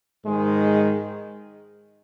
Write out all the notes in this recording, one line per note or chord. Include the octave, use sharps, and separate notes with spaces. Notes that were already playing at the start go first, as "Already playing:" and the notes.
G#2 D#3 G#3